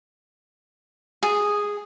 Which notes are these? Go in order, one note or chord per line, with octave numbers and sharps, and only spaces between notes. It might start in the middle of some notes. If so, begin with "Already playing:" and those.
G#4